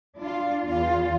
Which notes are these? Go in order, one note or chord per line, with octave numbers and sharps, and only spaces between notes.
D4 F4
E2 F4